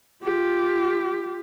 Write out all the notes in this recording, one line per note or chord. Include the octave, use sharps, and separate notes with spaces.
F4 G4